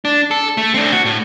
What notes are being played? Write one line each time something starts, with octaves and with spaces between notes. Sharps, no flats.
D4
A4
A3
C4 D4
F#4
A2